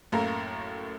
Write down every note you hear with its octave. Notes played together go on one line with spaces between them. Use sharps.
F#2 A2 A3 A#3 A#5